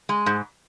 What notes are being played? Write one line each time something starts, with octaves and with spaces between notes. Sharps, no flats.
G#3
G#2